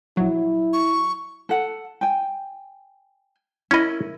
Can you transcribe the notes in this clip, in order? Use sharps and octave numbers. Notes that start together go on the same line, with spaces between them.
A#1 F#3 E4
C#6
A4 F#5
G5 G#5
C#4 E4 A#4 D#5 B5